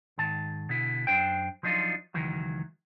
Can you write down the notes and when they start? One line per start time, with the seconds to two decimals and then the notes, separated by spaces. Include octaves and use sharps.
0.18 G#2 D#3 A5
0.69 B2 D3 E4
1.07 F#2 B2 D4 C5 G5
1.63 F3 F#3 D4 D#4 F4
2.14 C#2 D#3 E3 F#3